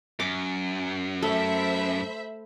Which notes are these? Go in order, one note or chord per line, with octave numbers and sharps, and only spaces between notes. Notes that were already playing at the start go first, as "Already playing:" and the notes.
F#2 D6
A3 C5 E5 B5